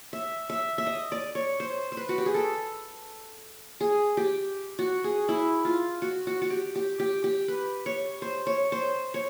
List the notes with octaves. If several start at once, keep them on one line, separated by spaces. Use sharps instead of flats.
E5
E5
E5
D#5
D5
C#5
C5
C5
B4
F#4
G4
G#4
A4
G#4
G4
F#4
G#4
E4
F4
F#4
F#4
F#4
G4
G4
G4
G4
B4
C#5
C5
C#5
C5
C#5